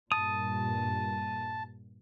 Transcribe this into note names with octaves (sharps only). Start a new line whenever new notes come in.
G2 A#2 A5 D#6